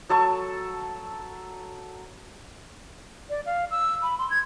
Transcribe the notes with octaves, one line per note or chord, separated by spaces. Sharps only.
F#3 A4 A5 C#6
D5
F5
E6
B5
C6
G#6